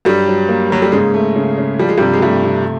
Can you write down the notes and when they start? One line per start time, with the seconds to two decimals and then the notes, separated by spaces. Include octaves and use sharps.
0.05 G2 F#3 G3
0.28 F#3
0.49 A#3
0.70 F#3 A#3
0.82 G3
0.92 G#2 C#3 G#3
1.14 A3
1.36 C#3
1.58 C#3
1.79 F3 G3
1.89 G#3
1.98 G2 C3 G3
2.14 G#3
2.22 G2 G3 A3
2.45 C3